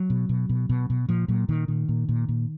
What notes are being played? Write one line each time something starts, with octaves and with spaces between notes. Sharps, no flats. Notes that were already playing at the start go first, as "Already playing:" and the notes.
Already playing: F#3
B2
B2
B2
B2
B2
A#2 F3
A#2 F#3
A#2 D#3
A#2 D#3
A#2
A#2
A#2